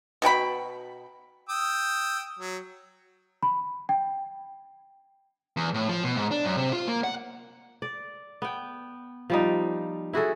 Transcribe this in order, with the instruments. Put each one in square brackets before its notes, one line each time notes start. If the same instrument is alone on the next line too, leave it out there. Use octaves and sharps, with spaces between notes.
[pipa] B2 F#4 G5 B5
[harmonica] G5 D#6 E6
F#3
[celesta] B5
G5
[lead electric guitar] E2
A2
F3
B2
G#2
D4
F#2
C3
F4
A#3
F#5
[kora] D5
B3 G5
F3 G3 D#4
E4 F#4 G#4 A4